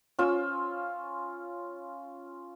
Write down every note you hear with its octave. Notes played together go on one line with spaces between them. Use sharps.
C#4 F4 E6